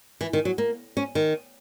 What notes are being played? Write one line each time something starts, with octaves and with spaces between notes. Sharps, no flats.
E3
D#3
F#3
A#3
C#4
D#3